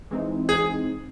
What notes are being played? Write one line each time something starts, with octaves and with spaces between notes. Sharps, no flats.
E3 G#3 C4 D#4
G#4